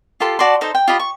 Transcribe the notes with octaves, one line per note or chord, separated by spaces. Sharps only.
F4 G4 A4 C6
F#4 D5 A5 C6
D#4 A4 C5 D#5
G5
F4 G4 D#5 B5
C#6